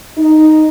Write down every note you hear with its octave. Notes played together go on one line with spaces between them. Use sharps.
D#4